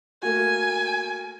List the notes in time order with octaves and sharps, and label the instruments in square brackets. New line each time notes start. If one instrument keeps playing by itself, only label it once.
[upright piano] A3 A#3 F#4 [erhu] G#5